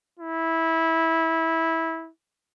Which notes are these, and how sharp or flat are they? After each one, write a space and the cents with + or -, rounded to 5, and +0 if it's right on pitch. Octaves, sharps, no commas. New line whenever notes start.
E4 -15